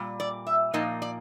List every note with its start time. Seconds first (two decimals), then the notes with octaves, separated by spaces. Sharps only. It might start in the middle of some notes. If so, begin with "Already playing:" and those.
Already playing: A#2 G3
0.20 D5
0.47 E5
0.73 A#2 F3 A#3 D#4 D#5
1.02 D5